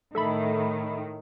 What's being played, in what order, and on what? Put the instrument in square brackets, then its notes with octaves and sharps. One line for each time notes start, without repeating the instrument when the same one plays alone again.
[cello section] A2 D#3 [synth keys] A4 E5 B5